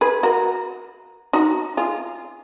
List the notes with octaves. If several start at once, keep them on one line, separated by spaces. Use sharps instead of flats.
G#4 B4
F#4 A#4
D#4 F#4
F4 G#4